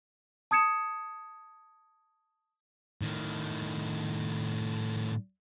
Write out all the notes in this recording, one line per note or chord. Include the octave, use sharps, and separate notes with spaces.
A5 D#6 G#6 C#7 E7
A2 D#3